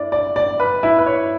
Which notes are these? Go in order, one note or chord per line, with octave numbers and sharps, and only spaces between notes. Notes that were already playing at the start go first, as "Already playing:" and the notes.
Already playing: A2 D4 D5
D5
D5
B4
E4
B4
C#5